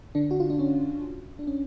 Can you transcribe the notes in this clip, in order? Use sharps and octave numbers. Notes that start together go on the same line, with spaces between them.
D3 D4
F#4
F4
D4
C#4
D4
C#4